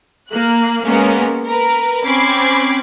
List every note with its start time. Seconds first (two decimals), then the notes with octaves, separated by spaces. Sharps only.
0.28 A#3 F#6
0.84 G#3 A#3 B3 C#4 A#4
1.46 A#4 B4
2.03 C4 C#4 B5 D6 G#6 C7